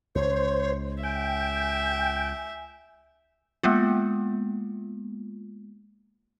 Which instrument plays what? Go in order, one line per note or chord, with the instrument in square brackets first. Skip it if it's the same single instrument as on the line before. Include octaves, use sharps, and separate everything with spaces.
[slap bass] C#2 [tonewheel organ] C5 [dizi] C#5
[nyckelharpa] E5 [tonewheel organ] G5 [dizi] G#5
[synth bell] G#3 A#3 B3 F4